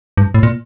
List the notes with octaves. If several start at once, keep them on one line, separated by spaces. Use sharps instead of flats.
G2
A2
A#2